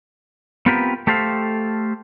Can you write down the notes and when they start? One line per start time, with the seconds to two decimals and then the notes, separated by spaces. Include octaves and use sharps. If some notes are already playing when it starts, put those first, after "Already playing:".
0.66 B3 C4 F4 G4 A#4 B4
1.07 A3 G4 A4 C5 F5